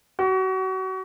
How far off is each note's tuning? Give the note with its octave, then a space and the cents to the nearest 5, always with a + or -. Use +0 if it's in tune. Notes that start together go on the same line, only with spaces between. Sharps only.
F#4 +30